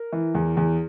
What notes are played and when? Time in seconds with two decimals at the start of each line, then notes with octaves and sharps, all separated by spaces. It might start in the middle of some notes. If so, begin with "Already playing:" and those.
Already playing: A#4
0.13 E3
0.35 E2
0.57 E2